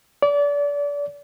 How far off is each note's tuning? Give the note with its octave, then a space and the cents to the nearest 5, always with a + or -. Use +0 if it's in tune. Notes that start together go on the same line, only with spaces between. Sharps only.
D5 -30